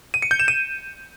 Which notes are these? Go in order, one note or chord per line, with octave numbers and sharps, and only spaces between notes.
D#7
C#7
G6
E7
D#7